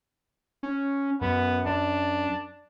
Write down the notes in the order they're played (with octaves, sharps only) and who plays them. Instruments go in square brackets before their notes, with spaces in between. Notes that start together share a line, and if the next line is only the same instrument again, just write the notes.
[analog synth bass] C#4
[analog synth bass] F#2 [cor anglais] B3
[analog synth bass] F#2 [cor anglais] D4